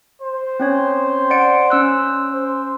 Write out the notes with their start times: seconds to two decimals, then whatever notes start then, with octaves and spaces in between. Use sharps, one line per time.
0.22 C5
0.60 C4 C#4 C#5
1.30 D5 F#5 D7
1.70 C#4 E6 F#6
2.32 C5